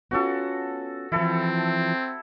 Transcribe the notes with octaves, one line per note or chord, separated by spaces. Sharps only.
B3 C#4 F4 F#4 A4
E3 F3 C4 E4 A4